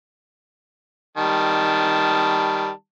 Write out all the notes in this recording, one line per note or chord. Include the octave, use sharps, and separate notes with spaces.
D#3 G3 A5